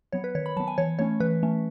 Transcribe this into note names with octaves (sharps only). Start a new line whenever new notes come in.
F#3 B3 C#5
B4
D#3 C#5
B5
F#3 B3 A5
G#5
E3 C#5
A3 C#4 C#5
E3 B4
A3 C#4